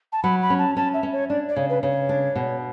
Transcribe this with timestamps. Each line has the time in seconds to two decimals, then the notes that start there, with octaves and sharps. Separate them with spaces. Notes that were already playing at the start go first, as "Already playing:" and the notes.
0.12 A5
0.23 F#3 B5
0.42 B5
0.50 C#4
0.59 A5
0.76 C#4 A5
0.94 E5
1.03 C#4
1.12 C#5
1.30 D4 D5
1.49 D5
1.56 C#3 C#5
1.70 B4
1.83 C#3 C#5
2.09 D4
2.36 B2